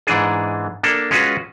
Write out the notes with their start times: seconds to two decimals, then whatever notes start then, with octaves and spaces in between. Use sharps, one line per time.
0.07 G#2 E3 D4 G#4
0.83 A#3 D4 A4
1.11 G#3 C#4 F4 F#4 B4